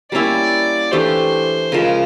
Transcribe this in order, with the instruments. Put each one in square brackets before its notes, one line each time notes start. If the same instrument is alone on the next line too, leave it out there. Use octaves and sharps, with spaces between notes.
[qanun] G3 A#3 C#4 E4 [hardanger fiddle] D5
[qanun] E3 A3 D4 G4 [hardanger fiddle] C5
[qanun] C#3 F3 G#3 [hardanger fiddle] A#4